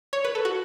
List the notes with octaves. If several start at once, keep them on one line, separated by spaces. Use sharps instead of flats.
C#5
B4
A4
F#4